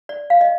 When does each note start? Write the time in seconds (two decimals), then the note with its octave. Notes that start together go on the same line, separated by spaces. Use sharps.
0.09 D5
0.30 F5
0.41 D#5